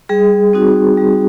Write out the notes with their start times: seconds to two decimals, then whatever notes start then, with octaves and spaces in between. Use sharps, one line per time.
0.09 G3 G#4
0.53 C4 D#4 F#4
0.97 G3